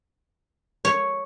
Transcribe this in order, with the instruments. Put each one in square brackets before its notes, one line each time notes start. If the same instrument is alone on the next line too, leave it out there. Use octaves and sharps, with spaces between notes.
[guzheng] C#5